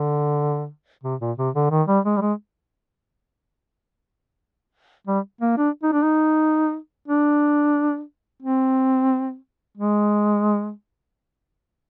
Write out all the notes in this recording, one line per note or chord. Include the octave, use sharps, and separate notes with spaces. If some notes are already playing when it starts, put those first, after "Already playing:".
Already playing: D3
C3
A#2
C3
D3
D#3
G3
G#3
G3
G#3
G3
A#3
D4
D#4
D4
D#4
D4
C4
G#3